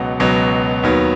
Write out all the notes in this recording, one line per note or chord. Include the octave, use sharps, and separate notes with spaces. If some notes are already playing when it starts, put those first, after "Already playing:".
Already playing: C#2 B2 F#3 F#5
C#2 B2 F#3
D#2 D#3 F#3 B3